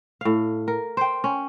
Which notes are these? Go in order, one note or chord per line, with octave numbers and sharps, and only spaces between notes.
A2 F5
A#4
C5 G5
C#4